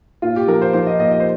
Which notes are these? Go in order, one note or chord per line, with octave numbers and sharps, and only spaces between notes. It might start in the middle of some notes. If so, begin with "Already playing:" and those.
A#2 F4
G4
F3 A#4
C5
F3 C5
D#5
A#2 D#5
D#5
C5